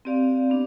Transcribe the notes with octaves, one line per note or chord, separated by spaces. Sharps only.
C4 G4 D5 F5
B3 D4